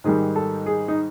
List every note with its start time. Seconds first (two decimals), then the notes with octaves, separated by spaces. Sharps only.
0.04 G#2 D#3 G3 G#4
0.36 A4
0.66 G#4
0.88 D#4